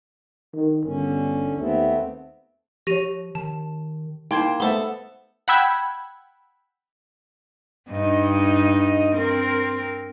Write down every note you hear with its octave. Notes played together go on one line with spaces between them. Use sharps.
D#3
G1 D3 C#4
D#2 A3 B3 C4
F3 G4 C#5 A#6 D#7 F7
D#3 A5
A#3 D#4 E4 C5 G5 B5 C6 G#6
A3 B3 A4 C5 E5 B5 G7
F#5 G5 B5 E6 G#6
G2 D#4 D#5
C4 A#4